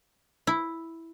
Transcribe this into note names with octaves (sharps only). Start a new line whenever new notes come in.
E4